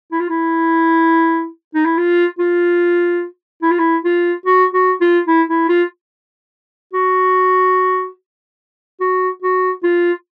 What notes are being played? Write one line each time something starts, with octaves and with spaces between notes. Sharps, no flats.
E4
F4
E4
D#4
E4
F4
F4
E4
F4
E4
F4
F#4
F#4
F4
E4
E4
F4
F#4
F#4
F#4
F4